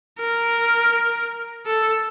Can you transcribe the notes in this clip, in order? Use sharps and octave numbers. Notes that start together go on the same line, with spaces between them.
A#4
A4